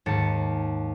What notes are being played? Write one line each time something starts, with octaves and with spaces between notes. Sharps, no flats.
D#2 G#2 A5 C#7